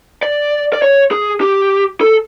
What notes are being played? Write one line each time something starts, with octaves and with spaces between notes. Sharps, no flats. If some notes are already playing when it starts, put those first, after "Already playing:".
D5
D5
C#5
G#4
G4
A4